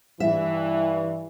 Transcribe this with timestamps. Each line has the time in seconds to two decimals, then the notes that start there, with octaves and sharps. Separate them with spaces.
0.20 G2 E3 E5